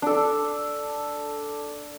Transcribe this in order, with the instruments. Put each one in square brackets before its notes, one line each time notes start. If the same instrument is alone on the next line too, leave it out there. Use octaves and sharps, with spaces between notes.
[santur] D4 A4